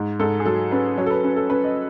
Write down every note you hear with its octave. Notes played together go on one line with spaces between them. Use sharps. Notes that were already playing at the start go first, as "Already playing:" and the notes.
Already playing: G#2
G#2 A4
G#4
F#3 A4
C#4 B4
F#3 C#5
A4
B4
C#4 B4
A4
C#4 B4
D#5